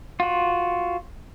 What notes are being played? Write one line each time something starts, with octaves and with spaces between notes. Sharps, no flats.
F4 F#4